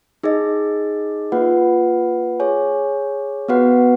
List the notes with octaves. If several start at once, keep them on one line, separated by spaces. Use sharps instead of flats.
D#4 G#4 D#5
A#3 F4 B4 F#5
G#4 C#5 G#5
B3 F#4 B4 F#5